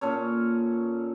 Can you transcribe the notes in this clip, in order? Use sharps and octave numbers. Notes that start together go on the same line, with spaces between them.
A#2 C#4 A4 C#5